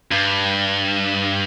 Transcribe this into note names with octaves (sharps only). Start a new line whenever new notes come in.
G2